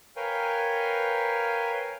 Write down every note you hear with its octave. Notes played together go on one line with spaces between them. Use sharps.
A#4 B4 C#5 F5 G5 G#5